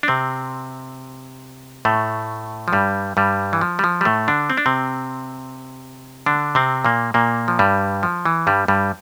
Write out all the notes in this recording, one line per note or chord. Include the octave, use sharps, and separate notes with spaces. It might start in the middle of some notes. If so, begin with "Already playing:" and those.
D4
C3 C4
A2 A3
F3
G2 G3
G2 G3
E3
F3
G3
F3
G3
A2 A3
D3 D4
C4
D4
C3 C4
D3 D4
C3 C4
A#2 A#3
A#2 A#3
F3
G2 G3
F3
E3
G2 G3
G2 G3